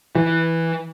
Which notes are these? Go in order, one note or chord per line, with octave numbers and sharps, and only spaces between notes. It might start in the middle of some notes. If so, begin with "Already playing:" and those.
E3